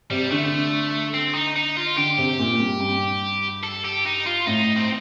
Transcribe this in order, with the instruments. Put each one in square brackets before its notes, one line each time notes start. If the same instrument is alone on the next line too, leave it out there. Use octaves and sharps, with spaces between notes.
[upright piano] C3 [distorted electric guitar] G3
[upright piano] D3 [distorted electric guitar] A3
[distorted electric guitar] C4
D#4
D#4
F4
[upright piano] D3 [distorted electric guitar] G4
[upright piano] C3
A#2
G2
G2
[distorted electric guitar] A4
G4
D#4
F4
[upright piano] A2 [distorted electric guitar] D#4
[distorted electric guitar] C4